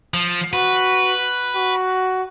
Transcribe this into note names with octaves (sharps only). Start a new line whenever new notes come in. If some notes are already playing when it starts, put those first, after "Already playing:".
F3
F#4 B4
F#4